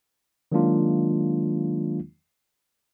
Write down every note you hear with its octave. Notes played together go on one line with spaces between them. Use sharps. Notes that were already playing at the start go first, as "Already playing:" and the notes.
D#3 F#3 G#3 A#3 D4 F4